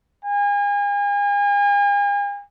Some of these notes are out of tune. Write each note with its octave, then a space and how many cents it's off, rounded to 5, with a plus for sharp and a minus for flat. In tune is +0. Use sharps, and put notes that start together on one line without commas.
G#5 -40